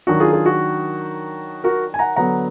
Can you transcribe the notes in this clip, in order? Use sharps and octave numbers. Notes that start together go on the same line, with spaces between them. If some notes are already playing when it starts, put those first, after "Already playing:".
D#3 F#3 D4 F#4
F4 G#4
F4 G#4
F#4
F#4 A#4
G#5
F#5 A#5
D3 F#3 B3 D4 F#5 A#5